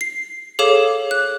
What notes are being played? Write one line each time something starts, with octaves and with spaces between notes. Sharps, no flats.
C7
G#4 A4 C#5 F5 D6 E7
F#6